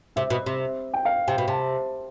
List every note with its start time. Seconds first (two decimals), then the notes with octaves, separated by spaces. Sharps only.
0.16 C3 E5
0.30 B2
0.46 C3
0.94 G5
1.05 F5
1.28 C3 G5
1.38 B2
1.48 C3 A5